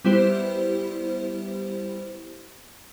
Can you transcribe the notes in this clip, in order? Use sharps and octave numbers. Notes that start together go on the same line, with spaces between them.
G3 B3 E4 G4 C5